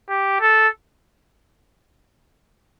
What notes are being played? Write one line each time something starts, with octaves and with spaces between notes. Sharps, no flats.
G4
A4